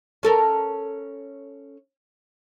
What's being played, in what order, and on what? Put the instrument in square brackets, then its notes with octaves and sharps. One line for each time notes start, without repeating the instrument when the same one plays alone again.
[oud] C#4 A4 A#4